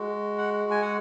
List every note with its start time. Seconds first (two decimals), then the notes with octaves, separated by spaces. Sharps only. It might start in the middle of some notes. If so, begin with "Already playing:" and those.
Already playing: G#3 F#4
0.38 F#5
0.71 G#5
0.82 F#5